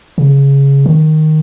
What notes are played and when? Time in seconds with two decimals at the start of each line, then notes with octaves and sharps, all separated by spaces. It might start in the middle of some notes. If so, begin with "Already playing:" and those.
0.18 C#3
0.86 D#3